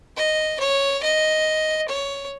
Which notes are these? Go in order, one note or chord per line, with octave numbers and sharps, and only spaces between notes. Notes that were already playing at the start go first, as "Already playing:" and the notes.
D#5
C#5
D#5
C#5